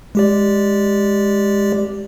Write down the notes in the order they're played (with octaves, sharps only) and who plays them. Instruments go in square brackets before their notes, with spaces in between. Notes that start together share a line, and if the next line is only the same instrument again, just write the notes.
[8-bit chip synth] G#3 G4 D5